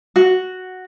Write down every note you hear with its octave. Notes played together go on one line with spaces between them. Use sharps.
F#4